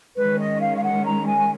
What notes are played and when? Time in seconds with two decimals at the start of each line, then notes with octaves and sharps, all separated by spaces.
0.16 D#3 G#3 C#4 B4
0.38 D#5
0.60 F5
0.76 F5
0.82 F#5
1.05 A#5
1.26 G#5